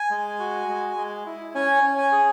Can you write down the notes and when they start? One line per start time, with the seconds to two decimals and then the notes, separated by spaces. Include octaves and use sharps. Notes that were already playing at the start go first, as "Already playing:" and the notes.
Already playing: G#5
0.10 G#3
0.39 F#4
0.69 G#3
0.97 G#3
1.26 E4
1.55 C#4 G#5
1.84 C#4
1.98 G#5
2.12 G#4